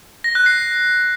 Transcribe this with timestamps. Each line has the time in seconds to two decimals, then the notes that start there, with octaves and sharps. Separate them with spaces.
0.24 A#6
0.35 F#6
0.46 C7